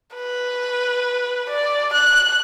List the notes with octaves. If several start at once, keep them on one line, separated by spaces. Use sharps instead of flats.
B4
D5
F#6